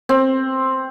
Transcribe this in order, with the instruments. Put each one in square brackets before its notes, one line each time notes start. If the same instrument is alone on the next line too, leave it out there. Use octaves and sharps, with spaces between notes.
[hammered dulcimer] C4